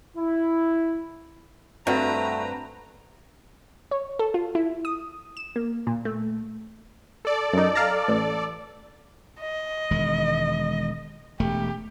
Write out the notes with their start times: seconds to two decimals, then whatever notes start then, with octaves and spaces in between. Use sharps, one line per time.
0.17 E4
1.87 G2 A3 C4 F#4 B4 A#5
3.91 C#5
4.19 A4
4.34 F4
4.55 E4
4.85 D#6
5.37 E7
5.56 A#3
5.87 A#2
6.05 A3
7.25 A4 D5
7.53 F#2 D#4
7.75 F5 A5 A#5
8.08 A1
9.40 D#5
9.91 E1 D#3 G#3
11.40 E1 A3 G4